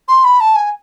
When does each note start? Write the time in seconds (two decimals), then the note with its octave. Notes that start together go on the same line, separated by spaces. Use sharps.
0.08 C6
0.24 B5
0.41 A5
0.55 G#5